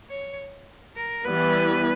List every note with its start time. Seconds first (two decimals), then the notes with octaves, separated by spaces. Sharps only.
0.10 C#5
0.97 A#4
1.25 E3 G3 B3 E4 B4